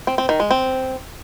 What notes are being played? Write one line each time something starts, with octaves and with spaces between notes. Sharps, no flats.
C4
C4
D#3
G#3
C4